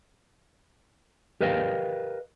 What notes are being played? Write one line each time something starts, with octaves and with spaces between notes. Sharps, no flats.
G4 A#4 B4 D#5 F5 G5